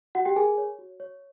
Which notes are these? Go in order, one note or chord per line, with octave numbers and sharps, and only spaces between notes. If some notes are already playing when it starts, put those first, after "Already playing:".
F#4 F#5
G4 G5
G#4 A#4 G#5
C#5
F#4
C#5